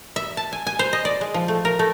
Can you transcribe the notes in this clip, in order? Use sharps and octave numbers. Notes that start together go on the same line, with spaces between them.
E5
A5
G#5
G#5
C5
D#5
D5
G#3
F3
A3
A#4
A3